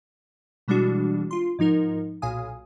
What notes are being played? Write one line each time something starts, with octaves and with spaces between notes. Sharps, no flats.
B2 E3 G3 G#3 D4 F#4
F4 C6
G#2 F3 D#4 A#4
B1 A#2 F5 G#5 D#6